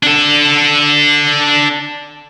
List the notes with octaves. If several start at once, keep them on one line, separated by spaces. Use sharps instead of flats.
D4 A4